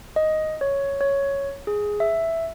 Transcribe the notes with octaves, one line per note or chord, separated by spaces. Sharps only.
D#5
C#5
C#5
G#4
E5